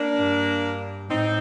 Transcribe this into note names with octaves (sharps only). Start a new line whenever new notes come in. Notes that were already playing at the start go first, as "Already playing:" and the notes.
Already playing: A#3 D4
G2
A2 C4 D#4